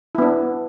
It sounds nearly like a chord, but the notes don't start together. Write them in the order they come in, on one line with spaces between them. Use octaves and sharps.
E4 B3 D4